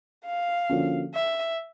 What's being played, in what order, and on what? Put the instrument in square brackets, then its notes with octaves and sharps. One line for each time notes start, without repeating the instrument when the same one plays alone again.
[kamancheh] F5
[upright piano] D3 F3 A#3 C#4 F#4
[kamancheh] E5